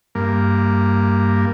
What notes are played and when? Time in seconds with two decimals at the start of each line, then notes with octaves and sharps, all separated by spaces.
0.15 G2 A#3